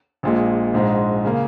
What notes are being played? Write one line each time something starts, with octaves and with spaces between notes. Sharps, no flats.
A#1 A#2 G#3
A#1 G#2 G#3
C#3 A#3